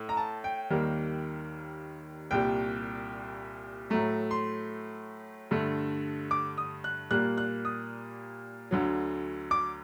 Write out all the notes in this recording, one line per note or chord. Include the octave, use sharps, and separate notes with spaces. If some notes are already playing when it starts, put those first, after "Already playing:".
Already playing: A2
A#5
A5
G5
D#2 D#3 G3 A#3
C2 A#2 G3 G5
A2 F#3 A3 A#5
C6
G2 D3 A3
D6
D#6
F#6
A#2 G3 A#3 F#6
F#6
D#6
D2 D3 F#3
D6